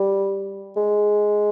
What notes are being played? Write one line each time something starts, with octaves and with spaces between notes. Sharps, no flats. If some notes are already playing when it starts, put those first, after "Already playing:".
Already playing: G3
G#3